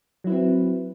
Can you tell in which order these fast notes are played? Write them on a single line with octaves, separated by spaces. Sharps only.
F#3 E4 B4 C4